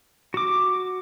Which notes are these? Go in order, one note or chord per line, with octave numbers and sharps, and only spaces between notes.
F#4 D6